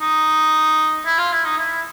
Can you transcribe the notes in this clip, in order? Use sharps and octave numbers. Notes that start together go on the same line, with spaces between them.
D#4
E4
F4
E4
D#4
E4